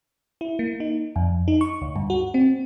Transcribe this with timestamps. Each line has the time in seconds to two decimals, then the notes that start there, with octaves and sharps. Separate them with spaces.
0.41 E4
0.59 A#3
0.80 D#4
1.16 F2
1.48 D#4
1.61 C#6
1.82 D2
1.96 G2
2.10 F#4
2.34 C4